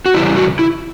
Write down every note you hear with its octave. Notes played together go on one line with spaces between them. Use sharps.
F#4
C#3 E3 G3 E4
F#4
E4